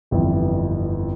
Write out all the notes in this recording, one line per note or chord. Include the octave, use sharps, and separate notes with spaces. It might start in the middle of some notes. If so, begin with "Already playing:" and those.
G1 F2 E3 G3